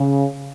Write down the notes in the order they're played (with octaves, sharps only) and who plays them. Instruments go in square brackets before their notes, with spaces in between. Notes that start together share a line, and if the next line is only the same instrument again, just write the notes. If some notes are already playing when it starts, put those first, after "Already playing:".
Already playing: [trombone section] C#3